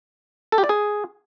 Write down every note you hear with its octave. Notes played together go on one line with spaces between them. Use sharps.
A4
G4
D5
G#4